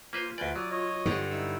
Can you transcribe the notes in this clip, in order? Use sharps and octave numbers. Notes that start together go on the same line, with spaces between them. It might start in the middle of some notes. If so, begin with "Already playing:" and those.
A#3 F4 B4 C5
D2 B4 D5 G#5 G6
F#3 D5 D#6
C#5 D#5
G2 D3
D#4 E4 E6